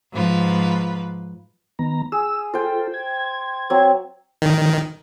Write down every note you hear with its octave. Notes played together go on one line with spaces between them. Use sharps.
G#2 F3 B4
D#3 B3 A#5
G#4 E6
F4 A4 C5 G5
G#6
F#3 C4
D#3